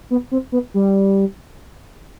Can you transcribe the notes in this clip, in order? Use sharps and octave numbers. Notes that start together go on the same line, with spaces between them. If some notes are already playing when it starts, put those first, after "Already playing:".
B3
C4
B3
G3